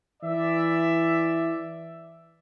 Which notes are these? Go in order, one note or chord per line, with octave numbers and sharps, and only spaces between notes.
E3 D5 E5